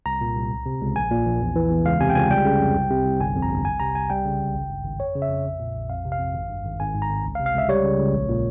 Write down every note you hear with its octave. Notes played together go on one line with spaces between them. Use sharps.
C2 A#5
A#2
C2
C#2
C3
C#2
A#1 G#5
A#2
A#1
E2
E3
E2
C#2 F5
C3 G#5
G5
C#2 G#5
G3 G5
C#3
F2
C2
C3
C2
G1 G#5
F2
A#5
G1
C2 G#5
C3 A#5
C2 G#5
G3 G5
C#3
C#2
G#1
G2
G#1
F2 C#5
C#3
E5
F2
A#1
A#2
A#1
F2 F5
C3
F5
F2
G#1
G2
G#1
G#1 G#5
G#2
A#5
G#1
C#2
F5
C3
F5
C#2 E5
G3 C#5
C#3
C#2
A#1
A#2